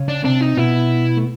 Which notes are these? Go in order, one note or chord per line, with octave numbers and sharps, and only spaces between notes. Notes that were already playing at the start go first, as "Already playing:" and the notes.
Already playing: C#3 C#4
D4
C3 C4 D4
D#4
B2 B3 E4
A3